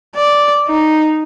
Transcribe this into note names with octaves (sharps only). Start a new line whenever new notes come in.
D5
D#4